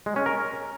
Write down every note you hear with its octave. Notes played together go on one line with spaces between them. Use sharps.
G#3
C#4
A#4